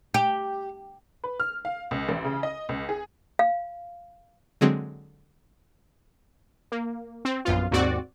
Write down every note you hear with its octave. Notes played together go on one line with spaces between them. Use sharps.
G4
B4
F6
F5
C#2
A1
C#3
D#5
C#2
G#4
F5
D3 F#3 G#3 C4
A#3
C4
A#1 F#2 B3 F4
D#2 G#2 C4 F#4 D5